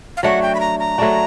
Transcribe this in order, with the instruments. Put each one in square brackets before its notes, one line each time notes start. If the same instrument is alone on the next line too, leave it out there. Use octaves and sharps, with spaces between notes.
[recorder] F5
[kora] F#3 A3 D4 F#4 [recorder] F#5
[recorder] G5
B5
A#5
A#5
[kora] F#3 A3 D4 F#4